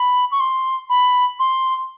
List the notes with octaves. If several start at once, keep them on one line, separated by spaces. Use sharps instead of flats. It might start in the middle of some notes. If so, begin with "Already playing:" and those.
Already playing: B5
C#6
C6
B5
C6